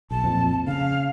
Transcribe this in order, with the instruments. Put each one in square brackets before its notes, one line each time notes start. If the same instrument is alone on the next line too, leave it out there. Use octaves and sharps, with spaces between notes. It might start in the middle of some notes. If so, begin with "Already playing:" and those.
[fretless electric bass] B1 [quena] A5
[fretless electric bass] F2 A#2
[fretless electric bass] C#3 [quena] F5